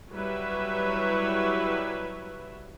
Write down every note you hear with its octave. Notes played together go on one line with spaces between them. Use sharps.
F#3 G3 E4 B4 C#5 E5